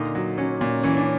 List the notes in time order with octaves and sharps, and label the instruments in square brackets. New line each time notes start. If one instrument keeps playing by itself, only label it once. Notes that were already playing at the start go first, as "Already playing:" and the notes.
Already playing: [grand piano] A#2 D3 [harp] D#4
[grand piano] F#3
[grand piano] F#3 [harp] C#4
[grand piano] A#2
[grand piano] E3 [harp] C#4
[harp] D4